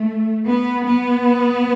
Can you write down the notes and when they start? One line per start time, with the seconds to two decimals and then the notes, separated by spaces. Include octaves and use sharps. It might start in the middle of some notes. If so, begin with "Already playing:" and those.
Already playing: A3
0.47 B3
0.85 B3